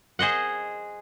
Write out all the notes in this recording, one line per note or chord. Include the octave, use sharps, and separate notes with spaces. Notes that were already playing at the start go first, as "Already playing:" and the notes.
G#4 C5 D#5 F#5